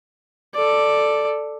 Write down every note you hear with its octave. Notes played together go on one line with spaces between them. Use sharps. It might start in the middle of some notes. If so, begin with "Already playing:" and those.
A4 D5